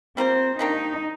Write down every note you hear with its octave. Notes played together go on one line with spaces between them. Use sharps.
G3 A#3 C4 F4 C5
D#3 A#3 D4 D#4 G4